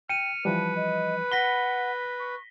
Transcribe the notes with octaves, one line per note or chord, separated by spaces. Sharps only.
G5 F6 C#7 D#7
E3 F3 G3 B4 A5
D#5
F#5 B5 A#6 B6 G7
C#6